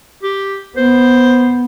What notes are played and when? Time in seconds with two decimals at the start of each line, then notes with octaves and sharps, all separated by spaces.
0.23 G4
0.77 B3 C5